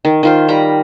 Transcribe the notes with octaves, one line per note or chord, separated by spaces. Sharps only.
D#3
D#3 F4 C5
G3 A#5 B5